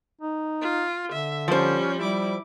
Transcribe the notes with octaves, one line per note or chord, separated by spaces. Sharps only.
D#4
F4
D3 E5
F3 G3 C#4 C5
G3 E4 D6